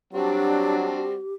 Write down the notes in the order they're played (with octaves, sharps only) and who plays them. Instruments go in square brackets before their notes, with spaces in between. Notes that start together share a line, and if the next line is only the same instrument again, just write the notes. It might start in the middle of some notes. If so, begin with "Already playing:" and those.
[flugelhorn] F#3 [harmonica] G3 C4 F#4 [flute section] D4 [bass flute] G4